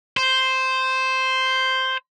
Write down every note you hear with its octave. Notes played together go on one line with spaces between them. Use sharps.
C5